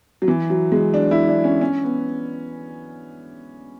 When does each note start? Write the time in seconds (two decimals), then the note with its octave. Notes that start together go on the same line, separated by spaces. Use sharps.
0.22 F#3
0.28 E3
0.50 F#3
0.72 G#3
0.94 D4
1.11 E4
1.28 D4
1.44 C#4
1.61 C#4
1.84 B3